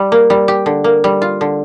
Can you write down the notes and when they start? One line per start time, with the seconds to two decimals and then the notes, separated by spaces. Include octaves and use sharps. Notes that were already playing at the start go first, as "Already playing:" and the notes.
Already playing: G3
0.12 A#3
0.30 G3
0.48 G4
0.66 D3
0.84 A#3
1.04 G3
1.22 F4
1.41 D3